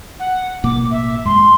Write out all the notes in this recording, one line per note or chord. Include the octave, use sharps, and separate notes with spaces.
F#5
A1 B2 A#3 D6
E5
F#2 G#3 C6